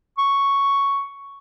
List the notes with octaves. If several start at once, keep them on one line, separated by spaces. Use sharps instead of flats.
C#6